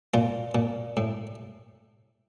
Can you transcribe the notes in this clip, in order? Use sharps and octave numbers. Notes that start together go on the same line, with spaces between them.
A#2 F4
A#2
A2